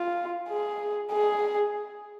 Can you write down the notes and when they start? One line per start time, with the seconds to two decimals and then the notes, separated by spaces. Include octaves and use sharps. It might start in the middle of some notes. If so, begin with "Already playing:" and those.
Already playing: F4
0.49 G#4
1.12 G#4